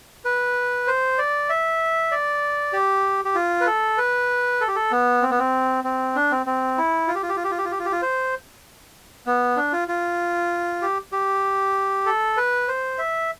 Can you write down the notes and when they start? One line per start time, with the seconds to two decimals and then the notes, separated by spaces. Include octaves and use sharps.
0.25 B4
0.87 C5
1.18 D5
1.49 E5
2.11 D5
2.73 G4
3.25 G4
3.35 F4
3.61 B4
3.67 A4
3.98 B4
4.60 A4
4.68 G4
4.76 A4
4.92 B3
5.22 C4
5.31 B3
5.39 C4
5.84 C4
6.15 D4
6.31 C4
6.46 C4
6.78 E4
7.08 F4
7.15 G4
7.23 F4
7.29 G4
7.36 F4
7.44 G4
7.51 F4
7.58 G4
7.65 F4
7.72 G4
7.79 F4
7.85 G4
7.92 F4
8.02 C5
9.26 B3
9.56 D4
9.73 F4
9.88 F4
10.82 G4
11.12 G4
12.06 A4
12.37 B4
12.68 C5
12.98 E5